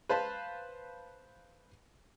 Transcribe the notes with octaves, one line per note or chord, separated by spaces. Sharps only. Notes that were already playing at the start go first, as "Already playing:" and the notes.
B4 C5 F5 A5 B5